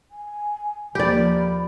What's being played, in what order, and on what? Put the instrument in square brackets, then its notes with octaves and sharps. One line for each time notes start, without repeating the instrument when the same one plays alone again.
[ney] G#5
[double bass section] D#2 F3 A#3 [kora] G4 D5 [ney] B5